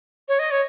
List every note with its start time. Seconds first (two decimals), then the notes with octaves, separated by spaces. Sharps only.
0.28 C#5
0.39 D#5
0.51 C#5